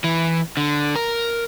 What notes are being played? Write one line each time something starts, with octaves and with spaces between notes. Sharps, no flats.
E3
D3
A#4